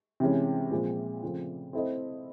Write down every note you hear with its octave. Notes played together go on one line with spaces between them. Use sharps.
C3 E3 G#3 C#4
A#2 F3 G#3 C4
C#3 F3 A3 C4
C4 E4 A4 C5 D#5